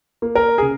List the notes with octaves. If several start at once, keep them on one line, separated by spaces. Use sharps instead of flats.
A#3
A#4
G#4
C#3